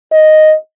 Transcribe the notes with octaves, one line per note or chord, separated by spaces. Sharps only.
D#5